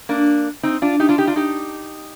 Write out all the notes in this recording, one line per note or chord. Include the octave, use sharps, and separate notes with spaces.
A#3 D4
C4 D#4
D4 F4
D#4 G4
D4 F4
D#4 G4
D4 F4
D#4 G4